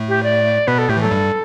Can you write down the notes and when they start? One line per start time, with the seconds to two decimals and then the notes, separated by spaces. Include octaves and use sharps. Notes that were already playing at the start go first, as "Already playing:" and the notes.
Already playing: A2 A3
0.08 G4
0.23 D5
0.67 B2 B3 B4
0.78 A4
0.89 A2 A3 G4
0.97 E3
1.00 F#3 A4
1.11 G2 G3